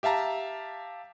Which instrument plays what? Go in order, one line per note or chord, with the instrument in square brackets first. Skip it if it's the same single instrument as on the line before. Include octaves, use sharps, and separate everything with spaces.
[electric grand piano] G4 E5 F5 A5 A#5